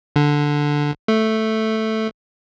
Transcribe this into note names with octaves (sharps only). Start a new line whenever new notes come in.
D3
A3